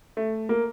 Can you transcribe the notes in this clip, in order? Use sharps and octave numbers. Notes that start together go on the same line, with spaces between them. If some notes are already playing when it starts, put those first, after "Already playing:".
A3
A#3